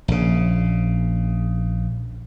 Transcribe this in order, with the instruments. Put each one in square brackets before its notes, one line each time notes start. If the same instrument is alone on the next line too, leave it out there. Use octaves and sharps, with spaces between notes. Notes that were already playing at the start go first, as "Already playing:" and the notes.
[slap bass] A#1 C#3